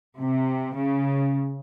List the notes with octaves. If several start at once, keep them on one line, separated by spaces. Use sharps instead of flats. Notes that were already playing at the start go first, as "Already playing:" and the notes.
C3
C#3